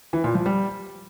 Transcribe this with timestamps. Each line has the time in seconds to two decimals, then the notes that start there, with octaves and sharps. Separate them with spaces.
0.13 E3
0.24 A#2
0.35 F3
0.46 G3